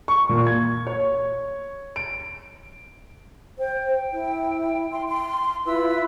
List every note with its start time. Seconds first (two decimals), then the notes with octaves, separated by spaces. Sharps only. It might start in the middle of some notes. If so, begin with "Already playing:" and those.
0.08 C#6
0.29 A#2
0.47 G#6
0.87 C#5
1.96 D7
3.58 C5 G5
4.12 E4
4.91 C6
5.08 C6
5.65 E4 F4 B4 E6